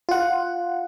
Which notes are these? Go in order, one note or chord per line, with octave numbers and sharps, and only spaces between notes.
F4 F#5